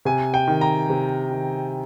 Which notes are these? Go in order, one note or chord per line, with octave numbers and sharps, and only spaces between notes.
C3 G#5
G5
D#3
A#5
C3
D#3